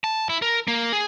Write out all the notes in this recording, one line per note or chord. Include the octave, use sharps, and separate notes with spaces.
A5
E4
A#4
A#3
G#4